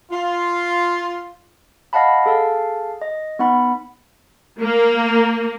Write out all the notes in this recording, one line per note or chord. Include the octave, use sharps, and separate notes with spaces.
F4
D#5 F5 F#5 A5 B5
G#4 A4 F5 A5
D#5
B3 D#4 F#5 B5
A#3